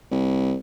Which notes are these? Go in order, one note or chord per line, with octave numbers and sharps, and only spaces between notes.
C2